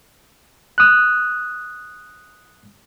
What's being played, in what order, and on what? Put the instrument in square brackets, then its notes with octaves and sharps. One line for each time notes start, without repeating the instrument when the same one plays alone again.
[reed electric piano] D#6 F#6